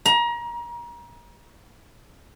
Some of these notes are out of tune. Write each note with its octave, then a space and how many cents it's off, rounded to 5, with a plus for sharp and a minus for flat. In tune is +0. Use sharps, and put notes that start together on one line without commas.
A#5 +30